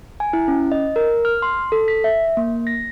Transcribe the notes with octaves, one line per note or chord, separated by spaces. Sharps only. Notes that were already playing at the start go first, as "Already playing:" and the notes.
G#5
E4
C#4
D#5
A#4
F6
C6
A4
B6
E5
A#3
A#6